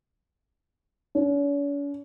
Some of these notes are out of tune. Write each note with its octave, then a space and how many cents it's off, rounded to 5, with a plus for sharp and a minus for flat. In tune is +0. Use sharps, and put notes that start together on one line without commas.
C#4 +45